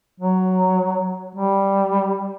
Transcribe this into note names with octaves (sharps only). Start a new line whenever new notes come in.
F#3
G3